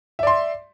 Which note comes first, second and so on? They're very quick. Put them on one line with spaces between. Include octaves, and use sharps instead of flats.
E5 D5 C6